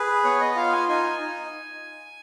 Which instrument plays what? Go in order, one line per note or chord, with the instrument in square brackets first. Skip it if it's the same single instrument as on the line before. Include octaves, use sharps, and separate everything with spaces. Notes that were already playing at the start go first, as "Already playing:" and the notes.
Already playing: [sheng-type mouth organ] G#4 B4
B3 C#5
D#5
F4 F5
G#5
D#4 G#5
D#4